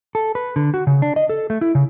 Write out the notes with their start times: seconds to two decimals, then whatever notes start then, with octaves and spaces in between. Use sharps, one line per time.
0.15 A4
0.35 B4
0.56 D3
0.74 F#4
0.87 C#3
1.02 D4
1.16 D#5
1.30 A4
1.50 A3
1.61 E4
1.75 C#3